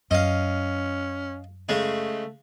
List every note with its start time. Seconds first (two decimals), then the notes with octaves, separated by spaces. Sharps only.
0.11 F#2 C#4 D#5 F5
1.69 C#3 G#3 A3